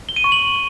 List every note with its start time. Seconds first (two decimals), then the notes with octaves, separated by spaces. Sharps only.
0.09 G7
0.16 D#7
0.24 C#6
0.32 F#7